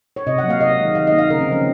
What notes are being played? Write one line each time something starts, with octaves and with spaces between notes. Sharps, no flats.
C#5
C3 D#5
F#5
F#3
A#3 F5
C3 D#5
D#3 G#3
D#3 F5
D#5
A#3
F5
C#3 A#4
C4
F3 A#3 C#4